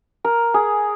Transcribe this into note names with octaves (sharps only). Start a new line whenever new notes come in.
A#4
G#4